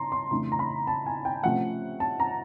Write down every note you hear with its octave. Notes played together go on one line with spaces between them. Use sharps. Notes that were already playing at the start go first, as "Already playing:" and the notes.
Already playing: C#3 A5 A#5 C6
C6
F2 C#3 E3 A3 D4 C6
A#5
B5
A5
G#5
G5
C3 F3 A3 C#4 F#5
A5
A#5